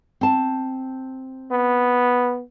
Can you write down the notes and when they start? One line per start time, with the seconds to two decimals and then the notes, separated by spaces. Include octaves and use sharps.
0.21 C4 A5
1.51 B3